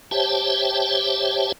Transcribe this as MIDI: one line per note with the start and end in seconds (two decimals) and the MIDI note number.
0.11 1.52 67
0.11 1.52 72
0.11 1.52 73
0.11 1.52 76
0.11 1.52 79
0.11 1.52 81